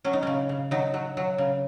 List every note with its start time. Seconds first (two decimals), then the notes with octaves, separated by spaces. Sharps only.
0.04 F#3 C#4
0.13 D#4
0.23 C#3 C#4
0.49 C#3
0.71 F#3 D#4
0.94 F#3
1.17 F#3
1.38 C#3